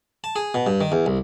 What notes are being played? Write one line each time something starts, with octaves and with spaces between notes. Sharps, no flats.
A5
G#4
B2
G2
D#3
E2
C2